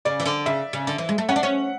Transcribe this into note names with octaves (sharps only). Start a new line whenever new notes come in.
C#3 D5
E3
D3
C#3 E5
C#3
D3
E3
G#3
A3
C#4 F#5
D4
C#4